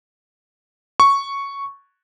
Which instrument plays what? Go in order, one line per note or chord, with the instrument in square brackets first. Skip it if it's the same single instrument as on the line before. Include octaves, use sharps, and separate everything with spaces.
[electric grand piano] C#6